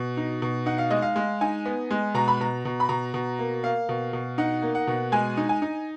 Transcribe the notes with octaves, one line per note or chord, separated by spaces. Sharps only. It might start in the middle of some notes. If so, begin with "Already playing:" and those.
Already playing: B2
D#4
B2
D#4 F#5
F5
G#3 D#5
F5
G#3
D#4 G#5
B3
G#3
B2 A#5
B5
B2 A#5
B2
B5
B2 A#5
B2
A#3
A#3 F5
B2
B2
D#4 F#5
A#3
F#5
B2
G#3 G#5
D#4
G#5
D#4